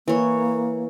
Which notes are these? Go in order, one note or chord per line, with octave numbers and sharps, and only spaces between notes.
E3 A#3 C#5